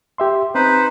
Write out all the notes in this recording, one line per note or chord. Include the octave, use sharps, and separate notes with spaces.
G4 E5 C6
C4 D#4 B4 C5